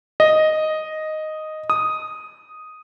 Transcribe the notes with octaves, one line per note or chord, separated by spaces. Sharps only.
D#5
D#6